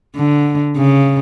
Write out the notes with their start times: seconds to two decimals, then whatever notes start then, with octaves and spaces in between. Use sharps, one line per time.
0.17 D3
0.77 C#3